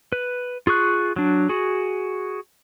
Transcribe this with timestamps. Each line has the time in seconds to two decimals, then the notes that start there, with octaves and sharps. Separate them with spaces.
0.12 B4
0.67 F4 G#4 C#6 F#6
1.16 F#3 D4
1.49 F#4 G#4